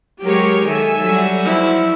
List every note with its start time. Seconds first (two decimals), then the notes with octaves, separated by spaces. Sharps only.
0.22 F#3 G#3 G4 A#4 C#5
0.66 D#3 A4 E5 G#5
1.02 F#3 G3 F#4
1.45 F3 E4